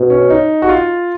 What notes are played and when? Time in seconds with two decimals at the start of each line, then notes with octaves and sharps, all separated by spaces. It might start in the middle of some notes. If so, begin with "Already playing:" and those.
Already playing: B2
0.10 C#4
0.30 D#4
0.62 F#4
0.69 F4